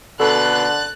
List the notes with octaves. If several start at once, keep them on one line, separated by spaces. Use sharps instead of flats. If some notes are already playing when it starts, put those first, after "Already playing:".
B2 D3 A4 F#6 A6